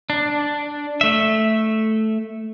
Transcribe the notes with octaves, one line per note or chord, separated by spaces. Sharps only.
D4
A3 E5